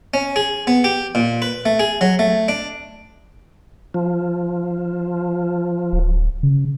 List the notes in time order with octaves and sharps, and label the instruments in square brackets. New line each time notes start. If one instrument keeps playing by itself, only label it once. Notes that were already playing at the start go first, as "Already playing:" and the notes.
[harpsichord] C#4
G#4
B3
G4
A#2
B4
A3
G#4
F#3
A3
D4
[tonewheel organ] F3
[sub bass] D1
C#3